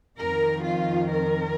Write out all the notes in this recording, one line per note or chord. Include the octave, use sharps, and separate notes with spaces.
F2 D#3 A#4
F4
A#4